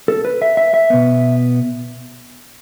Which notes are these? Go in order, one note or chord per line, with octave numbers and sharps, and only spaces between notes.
A4
B4
E5
E5
E5
B2 B3